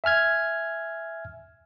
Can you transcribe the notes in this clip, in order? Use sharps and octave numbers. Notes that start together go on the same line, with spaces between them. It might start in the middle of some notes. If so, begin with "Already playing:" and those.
E5 G#5 F6 G#6